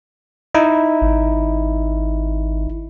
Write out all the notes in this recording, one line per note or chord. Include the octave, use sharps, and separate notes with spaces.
D#4 E4
G#1